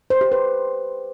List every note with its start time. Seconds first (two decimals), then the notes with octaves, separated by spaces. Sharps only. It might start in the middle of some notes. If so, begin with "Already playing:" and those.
0.10 C5
0.21 G4
0.32 B4